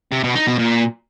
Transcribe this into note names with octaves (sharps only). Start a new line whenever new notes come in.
C3
B2
D#4
B2
A#2